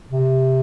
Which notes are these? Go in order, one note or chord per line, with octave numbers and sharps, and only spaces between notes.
C3